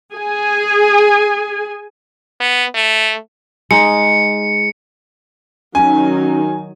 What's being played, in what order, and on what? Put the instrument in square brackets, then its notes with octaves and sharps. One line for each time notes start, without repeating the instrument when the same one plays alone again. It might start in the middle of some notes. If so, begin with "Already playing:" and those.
[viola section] G#4 G#5
[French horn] B3
A3
[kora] G#3 D#4 [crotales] C#7
[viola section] D#3 F#3 D#4 [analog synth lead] C#4 [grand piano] G#5